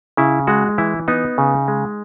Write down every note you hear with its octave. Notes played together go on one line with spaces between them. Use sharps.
C#3 E4
G#3 F#4
E3 E4
B3 D#4
C#3
G#3